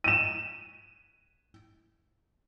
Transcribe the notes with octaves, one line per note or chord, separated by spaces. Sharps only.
D#7 E7